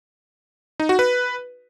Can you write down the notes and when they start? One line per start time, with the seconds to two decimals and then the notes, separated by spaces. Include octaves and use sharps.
0.80 D#4
0.89 F#4
0.99 B4